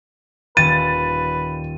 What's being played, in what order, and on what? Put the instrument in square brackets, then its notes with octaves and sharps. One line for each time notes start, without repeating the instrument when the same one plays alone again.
[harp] D#1 [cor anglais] B4 [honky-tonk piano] A6 [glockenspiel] D#7